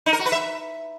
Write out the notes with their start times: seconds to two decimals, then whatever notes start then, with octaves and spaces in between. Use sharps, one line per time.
0.06 D#4
0.13 A#4
0.19 F#4
0.26 B4
0.32 E5